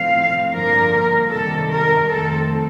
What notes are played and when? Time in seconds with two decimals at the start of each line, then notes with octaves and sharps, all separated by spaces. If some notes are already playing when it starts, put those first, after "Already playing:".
Already playing: A2 F3 C4 F5
0.52 G2 D3 F3 A#3 A#4
1.31 C3 D#3 G3 A4
1.70 A#4
2.10 F2 D#3 A3 C4 A4